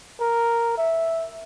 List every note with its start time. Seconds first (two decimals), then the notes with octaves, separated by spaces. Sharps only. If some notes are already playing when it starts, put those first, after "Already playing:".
0.21 A#4
0.78 E5